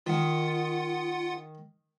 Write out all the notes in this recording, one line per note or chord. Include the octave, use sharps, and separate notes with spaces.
D#3 F4 F#5